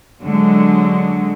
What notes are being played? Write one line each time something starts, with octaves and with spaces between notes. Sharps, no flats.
D3 F#3 G#3